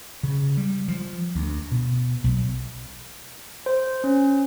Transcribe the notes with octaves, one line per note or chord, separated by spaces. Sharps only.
C#3
G3
F3
D2
B2
B1
C5
C#4